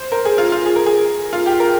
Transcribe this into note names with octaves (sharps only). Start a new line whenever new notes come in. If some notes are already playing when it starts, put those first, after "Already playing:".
Already playing: C5
A#4
G#4
F4
F4
G#4
A#4
G#4
F4
G4
A#4